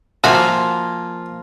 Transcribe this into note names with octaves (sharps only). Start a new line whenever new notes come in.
F3 A#3 F4 F#4 E5 G#5